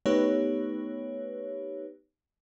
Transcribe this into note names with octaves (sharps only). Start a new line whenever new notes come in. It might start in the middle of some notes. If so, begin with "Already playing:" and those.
A3 B3 D#4 G4 B4 C#5